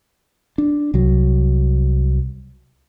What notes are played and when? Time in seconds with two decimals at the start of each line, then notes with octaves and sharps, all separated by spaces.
0.58 D4
0.94 C2 F#3